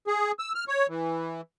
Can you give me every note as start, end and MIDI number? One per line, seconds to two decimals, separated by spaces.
0.07 0.32 68
0.39 0.52 88
0.55 0.64 89
0.68 0.87 73
0.88 1.41 52